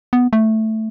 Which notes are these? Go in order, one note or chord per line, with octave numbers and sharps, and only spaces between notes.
B3
A3